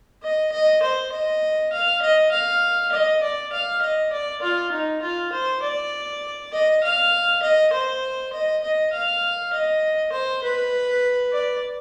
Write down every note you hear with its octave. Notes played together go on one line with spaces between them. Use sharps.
D#5
D#5
C5
D#5
F5
D#5
F5
D#5
D5
F5
D#5
D5
F4
D#4
F4
C5
D5
D#5
F5
D#5
C5
D#5
D#5
F5
D#5
C5
B4
D5